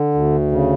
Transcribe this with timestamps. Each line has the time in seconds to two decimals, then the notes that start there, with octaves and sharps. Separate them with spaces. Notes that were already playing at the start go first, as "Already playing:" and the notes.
Already playing: D3
0.14 D2
0.52 C#3